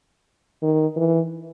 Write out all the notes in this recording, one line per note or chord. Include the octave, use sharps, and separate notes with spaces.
D#3
E3